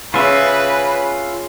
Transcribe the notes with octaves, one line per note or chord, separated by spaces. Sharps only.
C#3 F4 B4 E5